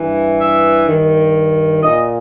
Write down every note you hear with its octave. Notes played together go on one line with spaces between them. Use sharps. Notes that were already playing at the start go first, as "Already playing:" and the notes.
Already playing: G2 E3
E5
G2 D#3
A#2 D#5